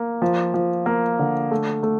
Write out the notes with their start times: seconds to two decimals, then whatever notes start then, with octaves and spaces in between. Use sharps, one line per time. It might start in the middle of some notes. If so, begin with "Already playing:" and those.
Already playing: A#3
0.22 F3
0.54 F3
0.86 A#3
1.19 D3
1.51 A3
1.83 A3